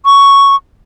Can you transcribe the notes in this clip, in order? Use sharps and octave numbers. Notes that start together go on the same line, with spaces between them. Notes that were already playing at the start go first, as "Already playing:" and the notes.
C#6